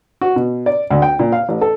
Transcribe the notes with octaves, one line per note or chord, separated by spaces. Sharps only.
F#4
B2
D5
D2
G5
A#2
F5
A1
A4